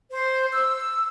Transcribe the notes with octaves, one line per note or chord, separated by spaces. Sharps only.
C5
E6